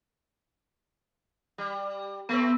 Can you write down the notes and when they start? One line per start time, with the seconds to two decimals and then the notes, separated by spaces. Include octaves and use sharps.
1.58 G3
2.29 A3 B3 C4 B4 E6